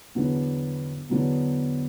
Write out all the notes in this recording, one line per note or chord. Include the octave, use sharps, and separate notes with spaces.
E2 D3 F#3 B3 D4
E2 D3 F#3 B3 D4